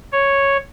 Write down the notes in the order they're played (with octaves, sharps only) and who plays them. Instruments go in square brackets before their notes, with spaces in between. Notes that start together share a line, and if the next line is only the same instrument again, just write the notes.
[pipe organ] C#5